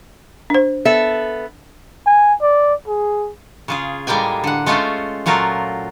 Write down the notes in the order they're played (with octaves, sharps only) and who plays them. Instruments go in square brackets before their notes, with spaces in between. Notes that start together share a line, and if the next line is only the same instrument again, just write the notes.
[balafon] D4 C5
[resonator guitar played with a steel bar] B3 A4 E5
[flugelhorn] G#5
D5
G#4
[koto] C#3 F4 G#4
A2 G3 G#3 A#3 G5 G#5
D3 F#5
G#3 A3 C#4 F4 C5
A#2 F#3 A3 F4 A#4